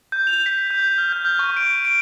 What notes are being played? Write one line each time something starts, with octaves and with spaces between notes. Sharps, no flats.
G6
F7
B6
G6
F6
G6
F6
C#6
D7
D7